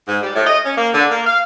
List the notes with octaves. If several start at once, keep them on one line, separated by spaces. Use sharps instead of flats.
G#2
G3
A2
D#5
C#4
A#3
D3
A#3
F5